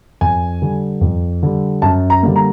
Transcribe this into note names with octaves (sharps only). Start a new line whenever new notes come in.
F2 G#5
D3 G3
F2
D3 G3
F#2 A5
A#5
D3 G3 A#3
A#5